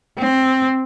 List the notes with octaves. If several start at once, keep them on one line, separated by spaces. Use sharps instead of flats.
C4